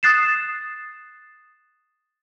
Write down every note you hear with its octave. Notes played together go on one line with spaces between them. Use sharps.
D#6 F#6 A6 C7 E7